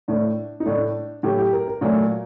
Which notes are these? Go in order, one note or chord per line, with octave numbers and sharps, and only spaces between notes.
A2 A3 D4
D#4
A2 A3 D4
A2 F#3 A3 G4
G4
A#4
A#4
A#2 F#3 A3